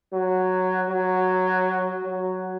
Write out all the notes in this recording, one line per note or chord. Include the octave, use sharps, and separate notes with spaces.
F#3
F#3
F#3